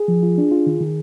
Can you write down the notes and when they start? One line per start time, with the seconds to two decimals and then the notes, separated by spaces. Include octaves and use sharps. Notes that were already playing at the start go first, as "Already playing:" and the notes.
Already playing: G#4
0.08 F3
0.23 F4
0.38 D4
0.51 F4
0.67 D#3
0.81 D#3